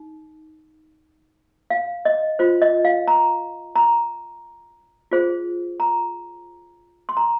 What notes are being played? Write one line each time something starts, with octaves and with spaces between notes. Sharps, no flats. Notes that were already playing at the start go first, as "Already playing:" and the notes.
Already playing: D#4
F5
D#5
F4 C5
D#5
F5
A#5
A#5
F4 G#4 C5
A#5
C6
A#5